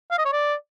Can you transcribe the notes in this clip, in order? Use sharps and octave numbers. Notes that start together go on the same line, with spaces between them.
F5
D#5
C#5
D5